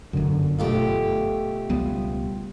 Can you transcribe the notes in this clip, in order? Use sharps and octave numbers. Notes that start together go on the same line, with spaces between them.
G1 F#2 D3
B2 A3 F4 G4
C#2 G3 B3